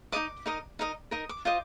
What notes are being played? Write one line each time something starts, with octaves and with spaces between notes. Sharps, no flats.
D#4 A#4 D#5 D6
D#4 A#4 D#5
D#4 A#4 D#5
D#4 A#4 D#5 D#6
D6
F4 C5 D#5 D6